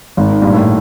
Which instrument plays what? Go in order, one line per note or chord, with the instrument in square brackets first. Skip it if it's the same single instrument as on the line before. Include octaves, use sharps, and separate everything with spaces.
[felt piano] G#1 [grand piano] D#3
[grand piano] D#3
[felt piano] G2 [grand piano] A#2
[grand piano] A2